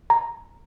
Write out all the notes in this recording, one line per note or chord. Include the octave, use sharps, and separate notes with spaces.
A#5